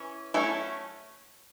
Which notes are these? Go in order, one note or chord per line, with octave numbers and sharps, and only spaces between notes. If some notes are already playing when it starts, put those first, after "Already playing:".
Already playing: E3 C#4
F#3 A3 C#4 E4 A4